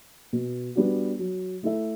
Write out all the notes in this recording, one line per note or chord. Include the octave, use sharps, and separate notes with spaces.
B2
G3 B3 D4 F#4
F#3
A3 E4 A4 E5